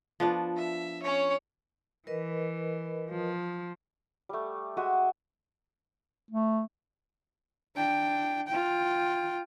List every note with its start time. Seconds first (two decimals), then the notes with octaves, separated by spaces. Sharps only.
0.20 F3 B3 D4
0.57 E5
1.02 C#4 C#5
2.07 E3 A#4 B4 D#5
3.10 F3
4.29 G3 A3
4.77 G#3 F#4 E5 D#6
6.31 A3
7.76 D4 G5
8.48 F4 G5